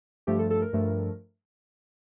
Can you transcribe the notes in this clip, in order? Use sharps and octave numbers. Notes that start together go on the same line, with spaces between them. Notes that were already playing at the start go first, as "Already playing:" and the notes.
G2 F3 A3 G4
A4
A4
A#4
G2 F3 A3